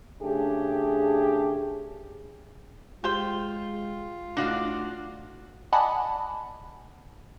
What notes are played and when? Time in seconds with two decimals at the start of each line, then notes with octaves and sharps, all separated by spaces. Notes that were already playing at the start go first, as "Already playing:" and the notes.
0.21 C#3 A3 D4 G4 G#4
3.04 G#3 F4 G4 C5 G5
4.37 A2 D4 D#4 F#4 F5
5.72 D5 D#5 F#5 G#5 A5 B5